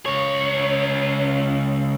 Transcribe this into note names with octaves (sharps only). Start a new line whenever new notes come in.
C#2 C#5